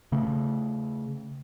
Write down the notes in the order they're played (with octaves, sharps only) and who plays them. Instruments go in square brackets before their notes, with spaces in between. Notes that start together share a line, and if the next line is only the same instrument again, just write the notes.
[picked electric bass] C#3 A3